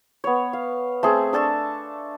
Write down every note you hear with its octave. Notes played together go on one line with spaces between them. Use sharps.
B3 C#5
F5
A3 C4 G#4
D4 A4 A5 C#6